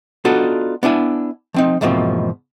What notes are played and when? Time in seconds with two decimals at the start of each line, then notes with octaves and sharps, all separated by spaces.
0.25 B3 D4 D#4 F4 F#4 A4
0.83 B3 D4 E4 G#5
1.54 F3 C4 D#4
1.81 E2 G#2 B2 F3 A#3 C4